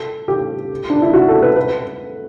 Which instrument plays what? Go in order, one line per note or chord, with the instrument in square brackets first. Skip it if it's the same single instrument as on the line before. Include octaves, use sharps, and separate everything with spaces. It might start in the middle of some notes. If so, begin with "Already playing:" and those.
Already playing: [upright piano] A4
G4
D4
E4
F#4
A4
B4
B4